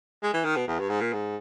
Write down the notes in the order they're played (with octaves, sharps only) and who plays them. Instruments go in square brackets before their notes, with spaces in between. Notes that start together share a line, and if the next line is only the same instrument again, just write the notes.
[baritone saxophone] G#3
E3
D#3
B2
E2
G2
G#2
A#2
G#2